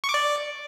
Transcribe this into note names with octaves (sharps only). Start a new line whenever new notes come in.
C#6
D6
D5